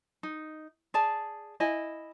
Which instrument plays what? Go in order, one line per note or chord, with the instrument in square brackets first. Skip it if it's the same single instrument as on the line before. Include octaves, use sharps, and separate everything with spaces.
[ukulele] D#4
G#4 D5 A5
E4 D#5 G#5